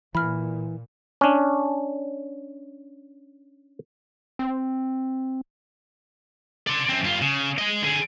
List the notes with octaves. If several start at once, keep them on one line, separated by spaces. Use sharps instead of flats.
A#2 E3 B5 F6
C#4 D4
C4
D5 C6
F#2 C4
G2 F4
C#3
G#3 D#5
D3 G#4